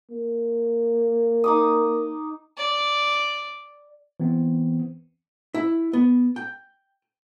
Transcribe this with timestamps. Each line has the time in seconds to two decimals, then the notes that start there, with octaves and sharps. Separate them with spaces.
0.11 A#3
1.44 D#4 D6 D#6
2.58 D5
4.20 E3 B3 C4
5.54 E4
5.93 B3
6.36 G5